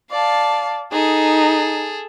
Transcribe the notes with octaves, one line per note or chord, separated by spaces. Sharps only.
D5 F5 A5
D#4 G#4 A4